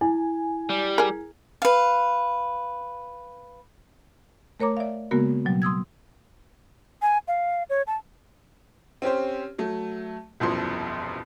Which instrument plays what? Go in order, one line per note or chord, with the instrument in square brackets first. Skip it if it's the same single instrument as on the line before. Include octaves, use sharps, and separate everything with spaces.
[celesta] E4 [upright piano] G#5
[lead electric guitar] G3
[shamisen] G#4 A#4
[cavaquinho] B4 F5
[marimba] A3 A#4 C#5 A#5 D6
D5 E5 F5
C#3 G#3 A#3 B3 F#4 A#4
B2 F#3 G3
C6 D#6 E6 G#6
[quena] G#5
F5
C#5
A5
[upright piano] C4 C#4 G4 C5
F#3 A3
E1 C2 F#2 B2 F3 C6